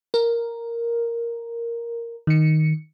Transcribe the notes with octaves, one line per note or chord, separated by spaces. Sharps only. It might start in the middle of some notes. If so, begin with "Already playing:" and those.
A#4
D#3 C#7